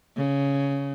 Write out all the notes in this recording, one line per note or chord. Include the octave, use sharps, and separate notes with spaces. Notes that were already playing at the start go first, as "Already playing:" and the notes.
C#3